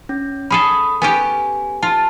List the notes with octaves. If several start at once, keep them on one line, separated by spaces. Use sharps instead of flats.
C#4
C#4 G#4 A4 B5 D#6
B3 C#4 G4 G#5
F4 A5